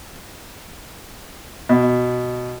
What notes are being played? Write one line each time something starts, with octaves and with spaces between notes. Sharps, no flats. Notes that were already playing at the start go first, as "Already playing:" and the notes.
B2